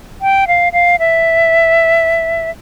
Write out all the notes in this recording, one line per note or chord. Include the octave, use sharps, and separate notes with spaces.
G5
F5
F5
E5